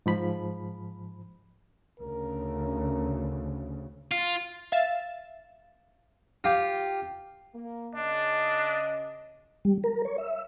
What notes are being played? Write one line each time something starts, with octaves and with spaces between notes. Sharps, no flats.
G#2 F3 B5
D2 C#3 A#4
F4
E5 F5 A6 E7
F4 G4
A#3
C#3 D4 D#5
G3
A#4
C#5
E5